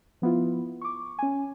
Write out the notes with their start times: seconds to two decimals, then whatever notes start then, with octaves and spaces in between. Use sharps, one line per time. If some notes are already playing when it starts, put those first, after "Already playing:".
0.22 F3 B3 E4 F4
0.81 C#6 D6
1.19 C#4 G#5